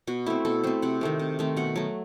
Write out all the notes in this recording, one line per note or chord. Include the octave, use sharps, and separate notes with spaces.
B2 F#4
A3 C4 E4
B2 A4
A3 C4 C5
C3 F#5
D#3 A3 C4
C3
D#3 A3 C4
B2 F#5
F#3 A3